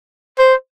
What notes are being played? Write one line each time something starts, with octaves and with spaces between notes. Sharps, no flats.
C5